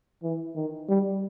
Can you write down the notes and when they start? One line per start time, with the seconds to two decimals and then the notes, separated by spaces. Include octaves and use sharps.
0.23 E3
0.56 D#3
0.89 G3